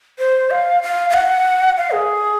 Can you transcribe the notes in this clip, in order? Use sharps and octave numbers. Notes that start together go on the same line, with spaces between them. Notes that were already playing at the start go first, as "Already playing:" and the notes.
C5
F5
F5
F5
F#5
F5
G#4